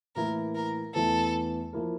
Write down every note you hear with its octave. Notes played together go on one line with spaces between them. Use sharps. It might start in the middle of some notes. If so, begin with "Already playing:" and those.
A2 E3 A#3 E4 A#4
A#4
E2 E3 A3 E4 A4
F3 A#3 E4 A#4